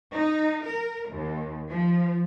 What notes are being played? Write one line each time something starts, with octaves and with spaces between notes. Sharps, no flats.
D#4
A#4
D#2
F3